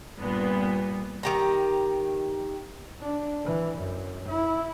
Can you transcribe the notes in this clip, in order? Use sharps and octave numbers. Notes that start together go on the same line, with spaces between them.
G2 A#2 B3
D#3 G4 A#5
D4
E3
F#2
E4